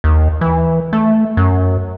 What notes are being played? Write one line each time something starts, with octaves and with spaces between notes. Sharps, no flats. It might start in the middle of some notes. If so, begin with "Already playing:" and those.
D#2
E3
A3
F#2